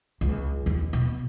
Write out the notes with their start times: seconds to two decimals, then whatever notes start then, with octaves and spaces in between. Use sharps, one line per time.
0.21 C#2
0.66 D#2
0.93 B2